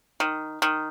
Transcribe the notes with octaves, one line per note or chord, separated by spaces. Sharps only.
D#3
D#3